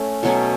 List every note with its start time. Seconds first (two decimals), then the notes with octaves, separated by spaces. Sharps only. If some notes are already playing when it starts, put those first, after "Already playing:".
Already playing: A3 C#4
0.23 B2 F#3 A3 C#4